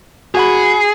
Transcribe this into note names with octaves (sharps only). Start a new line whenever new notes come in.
F#4 G#4 F#5 B5